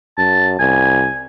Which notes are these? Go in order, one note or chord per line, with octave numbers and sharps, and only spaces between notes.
F#2 A5
C2 G#5